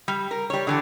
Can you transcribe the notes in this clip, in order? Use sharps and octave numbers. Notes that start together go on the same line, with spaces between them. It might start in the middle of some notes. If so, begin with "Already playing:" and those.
G3
A#4
G3 C#5
D3 E3 A5